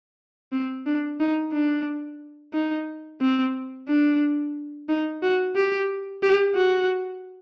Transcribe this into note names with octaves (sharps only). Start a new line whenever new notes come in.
C4
D4
D#4
D4
D#4
C4
D4
D#4
F#4
G4
G4
F#4